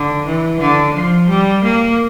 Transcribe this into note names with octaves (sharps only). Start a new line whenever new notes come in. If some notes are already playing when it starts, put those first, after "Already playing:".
Already playing: D3
E3
D3
F3
G3
A#3